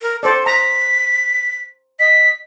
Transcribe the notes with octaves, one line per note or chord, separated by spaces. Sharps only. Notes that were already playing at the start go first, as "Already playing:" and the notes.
A#4
A4 C5 D5
A#5 B6
D#5 B6